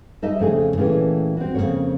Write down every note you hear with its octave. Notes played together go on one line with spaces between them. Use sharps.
G3 D#4 D#5 E5
F2 C#3 A3 D#4 G4 G#4
A#2 E3 A3 C#4 G#4 G5
C4 F#4
F2 C#3 F#3 A#3 C4 C#5